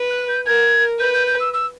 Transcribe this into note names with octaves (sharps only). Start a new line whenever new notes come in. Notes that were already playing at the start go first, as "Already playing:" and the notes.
Already playing: B4
F#6
G6
A#4 G#6
B4 G6
G6
G6
E6
E6